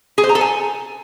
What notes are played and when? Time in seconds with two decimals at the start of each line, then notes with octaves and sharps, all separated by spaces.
0.18 G#4
0.24 C5
0.29 A#5
0.35 A4
0.41 G#5